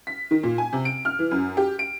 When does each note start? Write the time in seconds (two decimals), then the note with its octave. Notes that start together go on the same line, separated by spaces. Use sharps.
0.07 B6
0.31 D#3
0.43 A#2
0.58 G#5
0.73 C3
0.85 D7
1.05 F6
1.19 E3
1.31 F#2
1.57 G4
1.79 D7